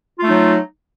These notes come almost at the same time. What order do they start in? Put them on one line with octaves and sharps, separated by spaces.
F4 A3 D#4 F#3